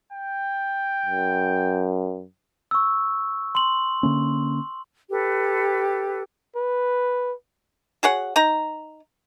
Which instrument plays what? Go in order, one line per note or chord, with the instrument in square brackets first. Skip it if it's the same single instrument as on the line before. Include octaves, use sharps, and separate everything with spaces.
[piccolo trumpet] G5
[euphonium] F#2
[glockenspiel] C#6 E6
C6 F#7
[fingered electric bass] D3 A#3 C#4
[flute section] G4 A4 B4
[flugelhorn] B4
[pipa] F#4 G#4 C#5 F#5
D#4 A#5